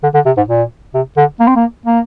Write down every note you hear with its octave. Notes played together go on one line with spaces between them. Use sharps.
D3
D3
C3
G#2
A#2
C3
D3
A#3
C4
A#3
A#3